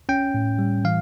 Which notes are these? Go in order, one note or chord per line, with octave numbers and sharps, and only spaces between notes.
C#4 G5
A2
G3
E3 F5